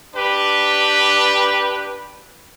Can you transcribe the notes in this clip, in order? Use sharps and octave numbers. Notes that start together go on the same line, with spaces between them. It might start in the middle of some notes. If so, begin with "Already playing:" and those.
D4 G4 B4